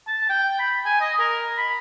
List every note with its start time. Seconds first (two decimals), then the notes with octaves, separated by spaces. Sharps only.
0.07 A5
0.30 G5
0.59 B5
0.85 G#5
1.01 D#5
1.20 A#4
1.57 B5